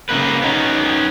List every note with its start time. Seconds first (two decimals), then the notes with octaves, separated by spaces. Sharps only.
0.09 C#3 A#3 B4
0.42 B3 C#4 D#4